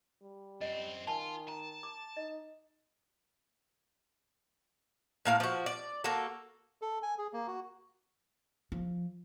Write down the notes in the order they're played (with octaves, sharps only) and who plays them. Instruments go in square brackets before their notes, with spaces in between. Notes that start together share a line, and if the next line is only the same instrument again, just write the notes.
[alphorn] G3
[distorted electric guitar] F#2 C4 [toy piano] D#5
[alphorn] D#3 [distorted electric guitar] F4 [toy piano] G#5 A5
[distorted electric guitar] A5 [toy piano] A#5
[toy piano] D6
[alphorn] D#4 [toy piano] D#5
[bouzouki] A2 A#3 F5
F3 F#4
D5
A#3 F#4 A4
[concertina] A4
G#5
G#4
A#3
F#4
[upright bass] F3